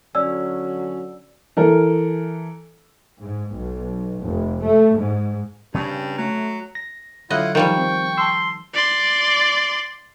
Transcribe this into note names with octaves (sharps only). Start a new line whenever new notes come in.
D3 F#3 C#4 D5 E6
E3 A4 A#4
G#2
B1
F1
A3
G#2
G2 C#3 C4 C#4
F#3 A3
A#6
D3 F#3 E4 F4 D#5 F#5 F#6
D#3 F3 G3 G5 C#6
C4
A5 C6 E6
D5 C6